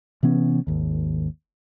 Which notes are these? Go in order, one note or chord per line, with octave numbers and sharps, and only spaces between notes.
C3 E3 B3 C#4
G#1 D#2